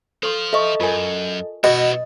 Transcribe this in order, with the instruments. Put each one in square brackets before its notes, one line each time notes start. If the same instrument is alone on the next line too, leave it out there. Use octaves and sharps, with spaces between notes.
[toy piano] A4 C6 [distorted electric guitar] C5 F5
[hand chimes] A4 D#5 [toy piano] E5 C#6
[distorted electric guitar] F#2 [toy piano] F4 A#4 G#5
[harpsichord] B2 [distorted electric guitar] E4 F#4 [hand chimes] D#5